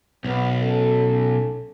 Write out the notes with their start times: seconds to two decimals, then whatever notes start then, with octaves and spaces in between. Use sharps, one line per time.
0.25 B1 B3
0.62 C#4 A4